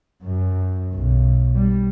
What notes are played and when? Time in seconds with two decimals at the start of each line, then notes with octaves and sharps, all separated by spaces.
0.24 F#2
0.94 B1
1.55 G3